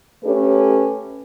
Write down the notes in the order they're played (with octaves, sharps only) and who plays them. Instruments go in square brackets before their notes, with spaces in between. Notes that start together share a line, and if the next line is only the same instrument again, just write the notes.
[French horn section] A3 C#4 G4 A4 B4